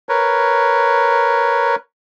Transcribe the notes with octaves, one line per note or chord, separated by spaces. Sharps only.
A#4 B4 C#5